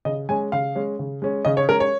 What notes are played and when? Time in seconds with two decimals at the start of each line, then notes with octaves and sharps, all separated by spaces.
0.05 C#3 D#5
0.29 G#3 C#4 G#5
0.52 C#3 F5
0.75 G#3 C#4
0.99 C#3
1.22 G#3 C#4
1.45 C#3 D#5
1.57 C#5
1.69 G#3 C#4 A#4
1.80 C#5